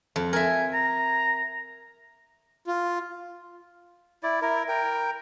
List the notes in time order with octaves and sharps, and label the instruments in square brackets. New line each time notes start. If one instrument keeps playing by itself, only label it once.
[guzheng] F2
[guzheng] A#4 E5 [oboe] G#5
[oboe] A#5
[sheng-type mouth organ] F4
[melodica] E4 D5
E4 A#4
A#4 G5